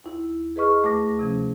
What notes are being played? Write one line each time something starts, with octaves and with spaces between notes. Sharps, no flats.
D#2 E4
G#4 B4 D#5 C#6 F6
D2 A3 D6 A#6
C3 F3 C#4